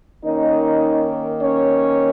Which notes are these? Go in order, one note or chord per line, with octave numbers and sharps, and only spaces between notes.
D#3 A#3 C#4 D#4 D#5
C#4 C#5